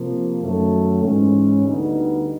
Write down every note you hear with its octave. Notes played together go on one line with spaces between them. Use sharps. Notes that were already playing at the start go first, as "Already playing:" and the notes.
Already playing: C3 F3 A#3
F#2 D#3 F#3 A3
G#2 E3 G#3 C#4
D2 D3 G3 B3 D#4